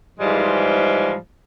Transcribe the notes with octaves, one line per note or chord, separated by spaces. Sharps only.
G#2 E3 F3 G3 G#3